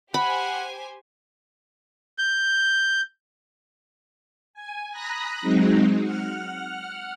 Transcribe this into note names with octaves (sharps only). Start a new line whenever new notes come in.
G4 C5 F#5 G#5 B5
G6
G#5
A#5 B5 D#6 F#6 A#6
F#3 G#3 C4 D#4
F#5 F6